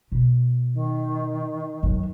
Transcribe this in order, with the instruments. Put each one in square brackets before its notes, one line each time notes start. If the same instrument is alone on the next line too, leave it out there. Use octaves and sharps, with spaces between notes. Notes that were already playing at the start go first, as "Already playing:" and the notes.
[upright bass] B2
[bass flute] D#3
[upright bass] F#2